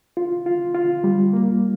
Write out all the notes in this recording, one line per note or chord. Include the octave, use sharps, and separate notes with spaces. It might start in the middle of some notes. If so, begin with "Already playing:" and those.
F4
F4
F4
G3
A#3